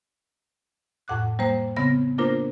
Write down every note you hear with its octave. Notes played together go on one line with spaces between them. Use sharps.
F2 A2 F#5 D6 F#6
G3 A#3 C5
C#3 B3 C4 A#6
A#3 D4 F4 A#4 C5